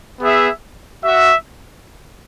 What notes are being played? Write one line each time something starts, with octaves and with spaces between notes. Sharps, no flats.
B3 G#4 E5
F#4 E5